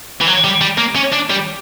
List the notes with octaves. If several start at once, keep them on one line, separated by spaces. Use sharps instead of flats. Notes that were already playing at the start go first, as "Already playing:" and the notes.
E3
F#3
G3
G3
A#3
C#4
D4
G3